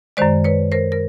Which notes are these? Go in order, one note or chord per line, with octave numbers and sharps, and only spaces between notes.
F#2 D#3 G#3 C5 D5
B4 C#5
A#4 C5
A#4